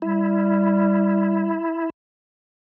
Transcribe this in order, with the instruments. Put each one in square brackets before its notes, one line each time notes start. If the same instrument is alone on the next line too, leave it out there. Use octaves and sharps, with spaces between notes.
[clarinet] G3 [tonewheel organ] E4